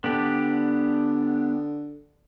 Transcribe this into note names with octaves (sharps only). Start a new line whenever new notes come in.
D3 B3 D4 G4